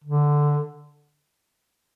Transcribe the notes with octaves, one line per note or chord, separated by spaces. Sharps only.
D3